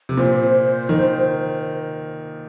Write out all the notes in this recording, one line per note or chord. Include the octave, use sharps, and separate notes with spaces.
C3
A#2 C5
C5
D#3